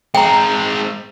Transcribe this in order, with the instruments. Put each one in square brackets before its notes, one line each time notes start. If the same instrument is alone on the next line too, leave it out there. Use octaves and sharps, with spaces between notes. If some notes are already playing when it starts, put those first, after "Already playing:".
[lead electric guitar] G#3 C4 [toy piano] G5 A#5